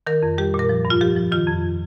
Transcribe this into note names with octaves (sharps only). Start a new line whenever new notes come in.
D#3 A#4
F2
G3 G4
A#2
A#4
F3
G2
F4
F3 G4
F3
D#3 F4
F2